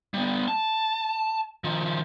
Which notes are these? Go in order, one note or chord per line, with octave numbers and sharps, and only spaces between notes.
G3 B3
A5
D#3 F3